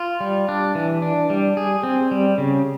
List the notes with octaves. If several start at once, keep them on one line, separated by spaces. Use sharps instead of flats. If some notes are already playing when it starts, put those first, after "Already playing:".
Already playing: F4
G3
D4
E3
D4
G3
G#4
C4
G3
C#3